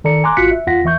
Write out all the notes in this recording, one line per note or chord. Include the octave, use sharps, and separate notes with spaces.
D#3 A4 D5 A#5 C#7
G#5 A#5 C6 D6 F#6
G#1 F4 F#4 F#6 B6 C#7
E5
E2 F4 F#5 A#6 B6
E2 E3 E5 C#6 G6